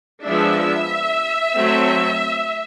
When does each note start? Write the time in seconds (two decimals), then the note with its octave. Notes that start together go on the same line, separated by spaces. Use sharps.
0.24 F3 G#3 B3 D4 E5
1.56 F#3 A3 C4